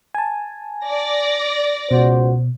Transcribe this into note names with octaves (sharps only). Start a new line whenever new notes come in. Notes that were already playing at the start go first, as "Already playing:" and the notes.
G#5 A5
D5 A#6
C#2 B2 F#4 C5